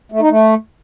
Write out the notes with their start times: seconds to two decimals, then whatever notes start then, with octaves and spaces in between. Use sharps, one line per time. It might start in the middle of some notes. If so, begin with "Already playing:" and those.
0.12 A3
0.21 D#4
0.30 A3